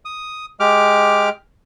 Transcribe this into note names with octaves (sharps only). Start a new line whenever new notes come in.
D#6
G#3 G4 D6 F6